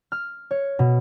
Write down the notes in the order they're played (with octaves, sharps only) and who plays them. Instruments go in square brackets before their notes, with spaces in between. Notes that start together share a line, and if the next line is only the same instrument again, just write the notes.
[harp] F6
C#5
B2